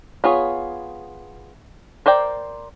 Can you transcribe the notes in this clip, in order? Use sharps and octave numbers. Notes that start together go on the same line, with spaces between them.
B3 F4 G#4 C#5
A#4 C5 D5 G5